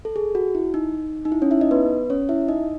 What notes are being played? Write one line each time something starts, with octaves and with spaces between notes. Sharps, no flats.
A4
G#4
F#4
E4
D#4
D#4
E4
C#4 C#5
E4 E5
D#4 D#5
B3 B4
C#4 C#5
E4 E5
D#4 D#5